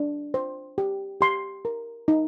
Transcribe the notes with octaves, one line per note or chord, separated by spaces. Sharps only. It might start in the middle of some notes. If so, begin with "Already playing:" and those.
Already playing: D4
C5
G4
G4 C6
A#4
D#4